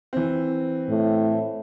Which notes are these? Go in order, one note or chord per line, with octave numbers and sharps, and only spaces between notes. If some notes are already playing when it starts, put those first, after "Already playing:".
E3 C4
A2